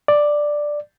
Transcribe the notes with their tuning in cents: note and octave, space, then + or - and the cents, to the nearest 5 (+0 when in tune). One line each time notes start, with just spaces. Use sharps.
D5 +5